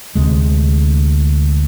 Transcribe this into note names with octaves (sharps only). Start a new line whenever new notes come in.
D2 C3 G#3